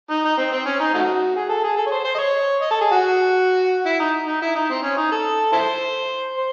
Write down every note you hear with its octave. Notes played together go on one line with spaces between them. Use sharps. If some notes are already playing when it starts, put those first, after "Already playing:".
D#4
D#4
C4
C4
C#4
D#4
A3 D#4 F#4
G#4
A4
G#4
A4
C#5
C5
C5
D#5
C#5
D#5
A4
G#4
F#4
E4
D#4
D#4
E4
D#4
C4
C#4
D#4
A4
E4 A4 C5
C5